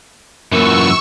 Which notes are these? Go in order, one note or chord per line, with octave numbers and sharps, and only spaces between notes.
F#2 E3 A#3 F4 C#6 E6